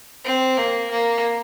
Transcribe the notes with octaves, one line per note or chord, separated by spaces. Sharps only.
C4
A#3
A#3